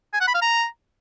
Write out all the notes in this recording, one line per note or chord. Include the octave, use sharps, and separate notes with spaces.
G#5
F#5
B5
F5
A#5